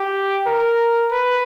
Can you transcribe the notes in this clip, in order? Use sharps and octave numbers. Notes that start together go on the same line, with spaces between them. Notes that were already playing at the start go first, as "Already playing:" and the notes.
Already playing: G4
A#4
B4